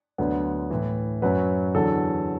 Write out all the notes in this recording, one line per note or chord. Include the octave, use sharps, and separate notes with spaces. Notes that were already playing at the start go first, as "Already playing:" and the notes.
D2 D3 F#3 B3
A2 E3
F#2 F#3 B4
E2 D3 F#3 A4